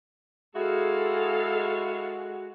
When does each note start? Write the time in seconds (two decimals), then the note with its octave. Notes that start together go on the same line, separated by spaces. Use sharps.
0.55 G#3 E4 F#4 G#4 A4 F5